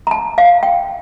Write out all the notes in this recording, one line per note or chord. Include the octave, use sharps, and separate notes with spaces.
A#5
A5
F5
G5